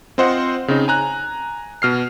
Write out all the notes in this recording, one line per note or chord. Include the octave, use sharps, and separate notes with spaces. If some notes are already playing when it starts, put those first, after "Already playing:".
C4 F4 C5 D#5 F#5
C#3 C4 D#4
G#5 A#5 F#6
B2 F6 C7